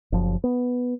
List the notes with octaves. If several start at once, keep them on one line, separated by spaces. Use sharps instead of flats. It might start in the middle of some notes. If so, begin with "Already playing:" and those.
F#1 F3
B3